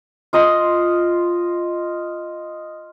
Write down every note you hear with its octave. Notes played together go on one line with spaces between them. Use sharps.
F4 D#5 C6